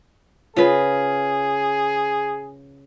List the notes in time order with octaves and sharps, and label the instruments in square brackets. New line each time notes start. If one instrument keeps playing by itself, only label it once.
[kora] C#3 [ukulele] F4 B4 [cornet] G#4